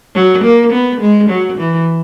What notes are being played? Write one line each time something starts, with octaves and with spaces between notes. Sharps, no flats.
F#3
A#3
B3
G#3
F#3
E3